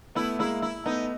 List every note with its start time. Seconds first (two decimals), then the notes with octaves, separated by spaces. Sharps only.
0.15 A3 B3 E4
0.39 G#3 A#3 E4
0.62 E4
0.86 A3 B3 D#4